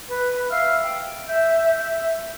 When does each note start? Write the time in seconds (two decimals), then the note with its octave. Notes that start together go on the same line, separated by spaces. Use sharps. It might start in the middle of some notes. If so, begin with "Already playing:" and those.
0.08 B4
0.50 E5 F5 E6 F6
0.83 G5
1.27 E5 G6
1.77 E5